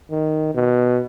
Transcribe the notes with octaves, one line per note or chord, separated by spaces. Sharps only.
D#3
B2